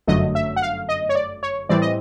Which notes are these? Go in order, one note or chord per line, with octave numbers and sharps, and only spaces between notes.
G1 F#2 D3 F#3 A3 D#5
E5
F#5
F5
D#5
C#5
D5
C#5
A2 E3 G3 C4 D5
D#5